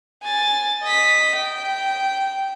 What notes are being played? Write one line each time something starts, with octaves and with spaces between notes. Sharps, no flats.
G#5 A6
D#5 B6
G5